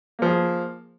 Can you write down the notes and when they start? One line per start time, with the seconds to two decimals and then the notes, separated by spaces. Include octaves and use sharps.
0.19 A#3
0.22 F3
0.25 G#4